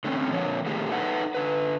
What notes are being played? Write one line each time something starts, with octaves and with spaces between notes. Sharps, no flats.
D3 A3 C4 C#4
A#2 D3 F3 C#5
A#2 D3 D#3 A3 G4 G#4
D#4 A4 B4 E5 F#5
D3 B4